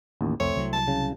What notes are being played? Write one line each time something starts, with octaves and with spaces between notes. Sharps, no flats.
A1 D#2
C2 F2 A3 C4 C#5
C2 F#3
A5
C#3